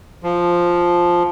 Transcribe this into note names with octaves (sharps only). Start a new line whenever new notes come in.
F3